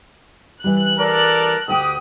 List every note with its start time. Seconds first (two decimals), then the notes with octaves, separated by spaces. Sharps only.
0.64 E3 G3 F#6
0.99 A4 A#4 D5
1.68 D2 G4 G5 D#6